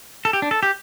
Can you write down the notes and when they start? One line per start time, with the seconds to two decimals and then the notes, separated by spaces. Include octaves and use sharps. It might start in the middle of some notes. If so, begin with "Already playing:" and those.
0.25 A4
0.33 G4
0.42 D4
0.51 A4
0.63 G4